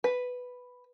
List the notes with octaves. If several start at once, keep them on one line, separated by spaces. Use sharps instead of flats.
B4